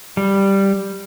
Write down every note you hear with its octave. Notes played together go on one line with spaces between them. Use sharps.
G3